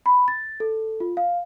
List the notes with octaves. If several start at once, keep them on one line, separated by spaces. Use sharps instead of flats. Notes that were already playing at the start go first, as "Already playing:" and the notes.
B5
A6
A4
F4
F5